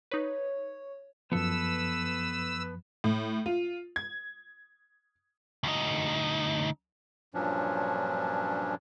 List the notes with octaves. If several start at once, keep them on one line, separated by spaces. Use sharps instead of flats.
D#4 B4 C#5
F#2 F3 B3 A4 B4 E6
A2
F4
G#6
D2 D#4
G2 A#2 F3 F#3 C#4 D4